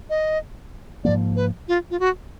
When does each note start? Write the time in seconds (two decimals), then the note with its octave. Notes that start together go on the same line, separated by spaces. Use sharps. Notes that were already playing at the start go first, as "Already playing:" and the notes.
0.10 D#5
1.04 G#2 F3 A#3 D5
1.36 B4
1.68 F4
1.91 F4
2.00 F#4